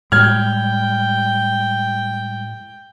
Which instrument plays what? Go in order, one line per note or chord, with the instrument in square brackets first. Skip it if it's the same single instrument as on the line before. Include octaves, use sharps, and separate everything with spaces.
[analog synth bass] A2 [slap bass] G3 G#3 [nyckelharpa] G5 [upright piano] F6 G#6